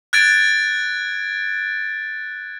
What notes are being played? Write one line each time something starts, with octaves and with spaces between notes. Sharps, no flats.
F#6 G#6 A6 D7